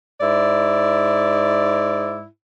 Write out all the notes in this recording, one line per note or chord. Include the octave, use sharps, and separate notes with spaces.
G#2 E4 D5